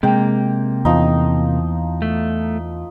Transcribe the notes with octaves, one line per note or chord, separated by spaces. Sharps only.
C3 G#3 A#3 G5 A#5
E2 F3 D#4
A3